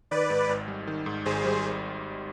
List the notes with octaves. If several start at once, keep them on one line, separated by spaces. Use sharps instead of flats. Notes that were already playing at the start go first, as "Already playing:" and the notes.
D#3 B4 D5
G#2
G#1
G3
D#3
G#2
G#1 G#4 C5
G3